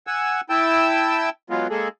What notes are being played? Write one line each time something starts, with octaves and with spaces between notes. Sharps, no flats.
F#5 G#5 E6
E4 G5 A5 E6
F#3 G#3 B3 F4
G#3 A#3 G#4 A4